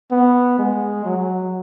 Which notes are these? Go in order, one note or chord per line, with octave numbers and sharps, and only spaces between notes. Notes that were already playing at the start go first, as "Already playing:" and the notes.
B3
G#3
F#3